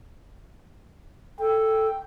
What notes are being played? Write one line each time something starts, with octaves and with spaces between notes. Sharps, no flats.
A4 G5